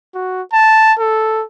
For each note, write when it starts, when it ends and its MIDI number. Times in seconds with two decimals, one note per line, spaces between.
0.14 0.42 66
0.53 0.93 81
0.99 1.44 69